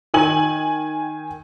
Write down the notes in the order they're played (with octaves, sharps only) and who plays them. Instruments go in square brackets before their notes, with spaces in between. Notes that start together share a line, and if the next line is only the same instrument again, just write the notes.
[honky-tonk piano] D#3 G5 G#5 F#7